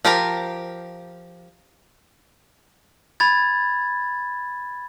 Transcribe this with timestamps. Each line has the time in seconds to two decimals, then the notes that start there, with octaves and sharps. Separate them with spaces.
0.05 F3 G4 A#4 A#5
3.20 B5 G#6 A6